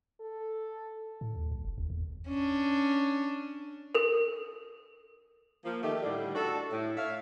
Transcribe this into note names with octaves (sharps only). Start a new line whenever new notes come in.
A4
A2
D#2
C2
F1
D#2
E2
C#4 D4
A4 A#4
F3 A#3
D#3 A3 G4 A4
A2 D3 G3
D4 F#4 A4
A2
C#5 E5 F5